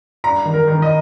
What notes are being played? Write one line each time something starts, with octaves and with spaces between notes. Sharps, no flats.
G2 A#5
D#3
A#4
D#3
D#5